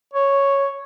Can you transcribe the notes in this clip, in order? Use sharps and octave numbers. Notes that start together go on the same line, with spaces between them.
C#5